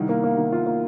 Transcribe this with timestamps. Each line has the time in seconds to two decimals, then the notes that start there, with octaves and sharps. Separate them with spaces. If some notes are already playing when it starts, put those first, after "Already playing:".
Already playing: C2 D#3
0.09 A#3
0.23 A#3
0.38 D#3
0.52 F4
0.67 A#3